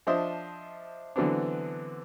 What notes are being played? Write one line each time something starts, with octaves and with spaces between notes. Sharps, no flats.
F3 D4 C5 D#5 E5 D#6
D3 E3 F#3 B3 C4 D4